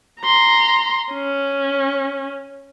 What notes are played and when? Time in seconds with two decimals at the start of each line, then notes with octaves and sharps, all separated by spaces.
0.21 A#5 C6
1.13 C#4